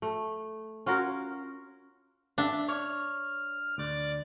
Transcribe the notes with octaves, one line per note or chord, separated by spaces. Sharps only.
A3
C#4 F4 F#4 A#4
D4 E5
C#5 F6
D2 D5